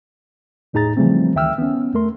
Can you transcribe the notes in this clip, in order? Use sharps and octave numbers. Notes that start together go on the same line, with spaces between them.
E2 A2 D#4 G#4 A#5 A6
C#3 E3 F3 G3 A3 C4
D2 D#3 E5 G5 E6 F6
B3 C#4
E2 A3 A#4 C6